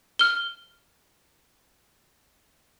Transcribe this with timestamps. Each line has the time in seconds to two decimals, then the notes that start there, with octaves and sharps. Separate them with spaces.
0.19 F6 G7